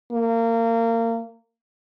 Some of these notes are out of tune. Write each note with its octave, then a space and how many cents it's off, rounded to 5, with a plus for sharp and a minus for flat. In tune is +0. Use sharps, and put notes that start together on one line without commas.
A#3 -25